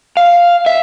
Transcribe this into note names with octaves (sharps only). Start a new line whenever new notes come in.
F5
E5